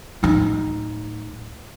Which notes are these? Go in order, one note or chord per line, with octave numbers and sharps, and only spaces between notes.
D1 D#4